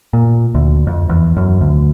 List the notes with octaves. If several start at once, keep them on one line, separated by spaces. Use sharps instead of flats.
A#2
D2
F2
E2
F#2
D2